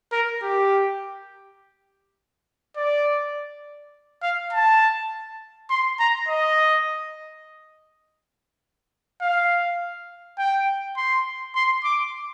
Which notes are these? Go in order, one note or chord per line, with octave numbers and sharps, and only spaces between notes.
A#4
G4
D5
F5
A5
C6
A#5
D#5
F5
G5
C6
C6
D6